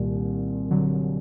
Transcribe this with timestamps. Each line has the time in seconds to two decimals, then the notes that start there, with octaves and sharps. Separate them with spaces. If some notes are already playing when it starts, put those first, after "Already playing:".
Already playing: C2 A#2 D#3 G3
0.71 D3 F#3